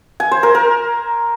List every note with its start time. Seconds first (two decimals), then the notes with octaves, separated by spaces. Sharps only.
0.20 G#5
0.31 C5
0.43 A#4
0.55 A#4